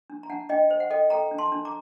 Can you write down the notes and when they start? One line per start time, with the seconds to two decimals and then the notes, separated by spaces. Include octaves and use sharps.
0.10 D4
0.23 A#5
0.30 D4 F#5 A5
0.49 D4 D#5 G5
0.70 C5
0.80 F#5
0.90 A4 D#5 G5
1.10 A4 G5 A#5
1.31 D4
1.38 A5 C6
1.52 D4
1.65 A#5 D6